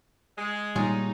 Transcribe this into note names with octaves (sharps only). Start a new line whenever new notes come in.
G#3
A#2 G3 D#4 F4 G#4 C#5